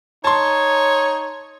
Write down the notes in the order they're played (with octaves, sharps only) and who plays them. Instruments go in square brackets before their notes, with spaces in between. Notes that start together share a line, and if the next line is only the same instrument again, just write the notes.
[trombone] D#4 [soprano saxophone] C#5 [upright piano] A5 C6